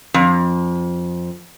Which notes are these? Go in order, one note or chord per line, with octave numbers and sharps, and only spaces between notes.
F2